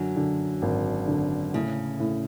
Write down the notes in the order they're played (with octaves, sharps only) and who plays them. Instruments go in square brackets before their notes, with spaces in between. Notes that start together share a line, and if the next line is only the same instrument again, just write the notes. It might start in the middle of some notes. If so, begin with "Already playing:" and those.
Already playing: [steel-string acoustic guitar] F#2 F#3 [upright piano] D3
[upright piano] D3
G#1
D3
[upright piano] A2 [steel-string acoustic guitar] C#3
[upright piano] A2